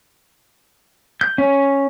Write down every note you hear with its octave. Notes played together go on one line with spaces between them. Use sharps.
G6
C#4